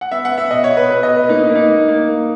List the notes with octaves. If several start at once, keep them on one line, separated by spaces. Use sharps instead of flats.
F#5
B3 E5
F#5
B3
E5
B2 D#5
C#5
B2
B4
B2 B4
D#5
B2
B4
A#3 D#4
D#4
A#3
D#4
A#3
A#3
A#3